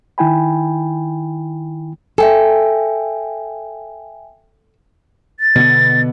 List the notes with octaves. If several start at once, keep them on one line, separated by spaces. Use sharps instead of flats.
D#3 E4 G5 G#5 B5
A4 E5 G5 G#5
A6
B2 D3 B3